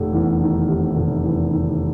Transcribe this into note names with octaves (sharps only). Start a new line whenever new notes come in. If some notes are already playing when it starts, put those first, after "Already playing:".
Already playing: F1 C3
E2
D#3
C3
F1
E2
D#3